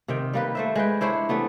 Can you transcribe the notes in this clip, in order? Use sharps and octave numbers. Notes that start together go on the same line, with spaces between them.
C3 D#3 G5
G3 A#3 B4
A3 C5 E5
G#3 B4 G5
D4 E4 C5 C#5
E3 G3 A3 B3